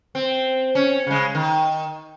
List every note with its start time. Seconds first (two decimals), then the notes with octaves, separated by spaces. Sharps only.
0.15 C4
0.75 C#4
1.07 C#3 G#3
1.35 D#3